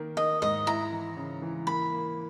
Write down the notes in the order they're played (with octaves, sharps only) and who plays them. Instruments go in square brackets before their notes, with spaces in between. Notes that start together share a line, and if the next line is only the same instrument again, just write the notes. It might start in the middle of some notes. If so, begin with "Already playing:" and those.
Already playing: [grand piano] D#3 A#3
[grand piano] D#3 [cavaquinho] D#5
[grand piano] G#2 [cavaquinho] D#5
[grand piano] E4 [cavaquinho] A#5
[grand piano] E3
C#3
E3
[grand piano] A#3 [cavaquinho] B5
[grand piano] A#3